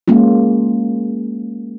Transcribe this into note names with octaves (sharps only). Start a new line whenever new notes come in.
G#3 A#3 C#4 F4